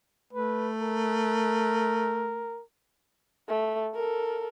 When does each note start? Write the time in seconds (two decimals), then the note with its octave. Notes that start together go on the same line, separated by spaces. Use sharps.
0.33 A3 B4
0.81 A#4
3.48 A3
3.95 A4 A#4